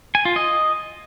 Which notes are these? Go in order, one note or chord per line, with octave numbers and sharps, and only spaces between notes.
G#5
F4
D#5